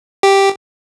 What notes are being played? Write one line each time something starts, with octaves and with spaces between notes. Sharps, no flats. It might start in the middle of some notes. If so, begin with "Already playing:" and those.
G4